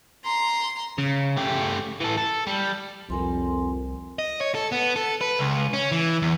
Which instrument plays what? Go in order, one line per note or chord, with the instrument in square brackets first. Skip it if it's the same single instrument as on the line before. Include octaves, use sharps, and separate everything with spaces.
[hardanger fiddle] A#5 C6
[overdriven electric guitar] C#3
A3 G4
E3 A4
A4
G3
[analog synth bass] C2 [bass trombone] F2 [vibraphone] A#4 G#5 C6
[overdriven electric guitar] D#5
C#5
A4
B3
A4
B4
C#2
C#4
E3
E2